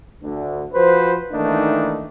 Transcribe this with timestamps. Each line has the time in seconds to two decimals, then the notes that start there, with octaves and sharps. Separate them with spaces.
0.23 D2 D3
0.74 F3 F#4 B4 C5
1.32 D#3 E3 A3 A#3 D4 D#4